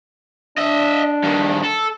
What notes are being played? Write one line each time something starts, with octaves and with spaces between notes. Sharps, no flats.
D4 D#5 E5
G2 D#3
A4